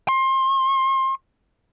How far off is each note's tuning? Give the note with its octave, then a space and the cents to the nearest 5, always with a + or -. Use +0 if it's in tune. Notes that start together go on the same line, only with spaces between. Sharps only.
C6 +25